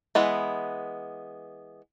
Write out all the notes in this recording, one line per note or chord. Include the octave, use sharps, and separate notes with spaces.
E3 G#3 B3